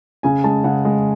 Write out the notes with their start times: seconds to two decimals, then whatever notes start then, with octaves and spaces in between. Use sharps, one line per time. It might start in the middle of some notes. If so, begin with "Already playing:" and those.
0.23 C#3 G#5
0.44 G#3 A5
0.64 C#3 F#5
0.85 G#3